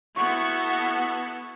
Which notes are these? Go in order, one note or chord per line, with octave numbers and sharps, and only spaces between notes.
B3 E4 F#4 A4 C#6